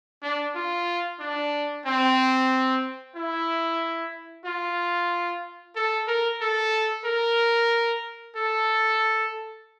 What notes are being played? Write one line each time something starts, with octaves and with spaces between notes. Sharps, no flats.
D4
F4
D4
C4
E4
F4
A4
A#4
A4
A#4
A4